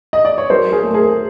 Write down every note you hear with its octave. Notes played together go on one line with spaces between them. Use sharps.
D#5
D5
C#5
F#3 A#4 C5
G#4 A#4
A3
G#4 A#4